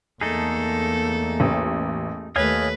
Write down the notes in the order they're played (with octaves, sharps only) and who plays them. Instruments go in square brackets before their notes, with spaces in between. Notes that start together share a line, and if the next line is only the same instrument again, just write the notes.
[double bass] E2 A#3 [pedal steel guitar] A3 D#4 G#4 [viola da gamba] A4
[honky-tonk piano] A1
[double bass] D#2 A3 [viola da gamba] B4 [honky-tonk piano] C#5 [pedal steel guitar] D#5 F5 G#5